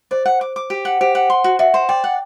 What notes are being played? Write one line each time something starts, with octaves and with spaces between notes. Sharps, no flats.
C5 D5
F#5
D6
D6
G4
F#5
G4 C5
F#5
C6
F#4
F#4 E5
C5
D5 G5
F#5